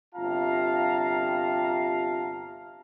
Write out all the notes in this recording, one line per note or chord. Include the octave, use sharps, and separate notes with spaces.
G1 C3 F4 F5 A5 A#5